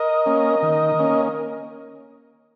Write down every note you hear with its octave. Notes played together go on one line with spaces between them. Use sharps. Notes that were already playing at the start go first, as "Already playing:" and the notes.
Already playing: A#4 D#5
A#3 C#4
D#3
A#3 C#4